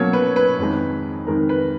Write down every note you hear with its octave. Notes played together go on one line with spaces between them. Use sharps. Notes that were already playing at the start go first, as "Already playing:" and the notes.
Already playing: B2 F#3 A#3 C#4 C#5
B4
B4
F2 D#3 G#3 D#4
F2 D#3 G#3 D#4 A#4
B4